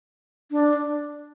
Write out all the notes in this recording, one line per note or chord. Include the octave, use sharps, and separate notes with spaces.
D4